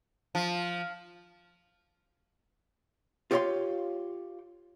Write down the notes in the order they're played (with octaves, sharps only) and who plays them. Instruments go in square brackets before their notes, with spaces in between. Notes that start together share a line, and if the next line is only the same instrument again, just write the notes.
[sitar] F3
[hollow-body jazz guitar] F4 G4 C#5 D#5 F5 C6